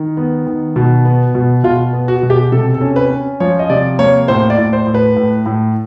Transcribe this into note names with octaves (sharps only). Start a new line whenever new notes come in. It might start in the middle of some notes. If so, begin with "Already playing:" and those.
Already playing: D#3
B3
D#3
B2
B3
B2
B2 F4
B3
F#4
B2
G4
C3 A4
A4
C#4
B4
C#4
F3 C#5
D#5
C3 D5
A#3 C#5
A2 C5
D5
A2
C5
A2
B4
A2
A2